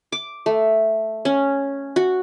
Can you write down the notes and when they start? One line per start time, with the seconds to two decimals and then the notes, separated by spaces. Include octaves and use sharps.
0.12 D6
0.46 A3
1.25 C#4
1.96 F#4